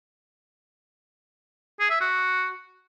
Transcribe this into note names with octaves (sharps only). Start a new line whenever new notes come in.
G#4
E5
F#4